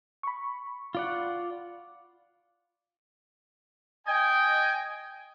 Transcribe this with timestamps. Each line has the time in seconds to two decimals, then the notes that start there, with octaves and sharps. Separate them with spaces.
0.23 B5 C#6
0.95 F4 D5 F#5
4.06 D#5 G5 G#5